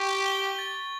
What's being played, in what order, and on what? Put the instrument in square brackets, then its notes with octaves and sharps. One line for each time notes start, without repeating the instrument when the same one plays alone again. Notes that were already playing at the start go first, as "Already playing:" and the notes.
Already playing: [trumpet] G4 [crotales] C#6
[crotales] G7
A6